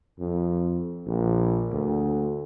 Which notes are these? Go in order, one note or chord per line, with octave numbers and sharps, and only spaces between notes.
F2
A#1
D2